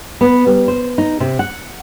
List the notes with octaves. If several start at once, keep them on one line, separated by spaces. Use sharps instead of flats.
B3
G3
C5
D#4
C3
F#5